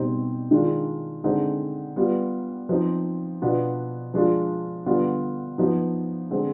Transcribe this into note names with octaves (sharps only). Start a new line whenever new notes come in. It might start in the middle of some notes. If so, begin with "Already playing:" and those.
Already playing: B2 G3 C4 D#4
D#3 G#3 D4 F4
D3 G#3 C4 D#4
G3 B3 F4
F3 C4 D#4
B2 B3 D4 F4
F3 G#3 D4 F4
D3 G3 B3 F4
F3 B3 D#4
D3 G#3 C4